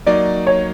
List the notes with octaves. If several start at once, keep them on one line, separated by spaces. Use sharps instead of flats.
F#3 A#3 D#4 D5
C#5